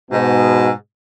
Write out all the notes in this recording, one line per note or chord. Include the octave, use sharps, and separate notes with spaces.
G#2 B2